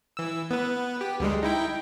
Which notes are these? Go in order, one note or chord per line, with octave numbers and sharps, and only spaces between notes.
E3 E6
B3 B4
G4
D2 G3 G#3
D#4 E4 G5